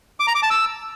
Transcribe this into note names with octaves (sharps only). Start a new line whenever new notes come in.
D6
A#5
D6
A5
E6